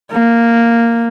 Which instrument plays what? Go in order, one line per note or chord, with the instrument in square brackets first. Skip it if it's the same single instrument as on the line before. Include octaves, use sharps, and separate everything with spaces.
[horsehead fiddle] A#3